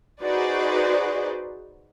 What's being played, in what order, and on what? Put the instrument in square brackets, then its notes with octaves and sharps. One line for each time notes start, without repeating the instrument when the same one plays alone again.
[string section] D#4 F#4 G#4 B4 C5 D5